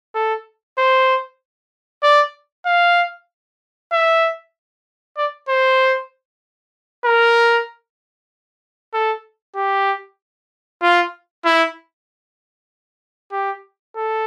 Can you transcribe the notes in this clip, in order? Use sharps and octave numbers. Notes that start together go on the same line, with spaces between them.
A4
C5
D5
F5
E5
D5
C5
A#4
A4
G4
F4
E4
G4
A4